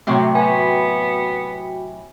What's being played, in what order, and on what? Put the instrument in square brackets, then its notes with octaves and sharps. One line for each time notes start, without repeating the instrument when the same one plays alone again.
[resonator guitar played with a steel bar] A2 C3 F#3 [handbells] A3 C#6 [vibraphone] F#4 G5
[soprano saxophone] B3 [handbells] G#5 B5